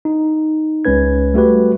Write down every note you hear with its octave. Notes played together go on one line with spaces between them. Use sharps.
D#4
C#2 G#3 C#4 B4 G#6
G3 A3 F#4 G4 B4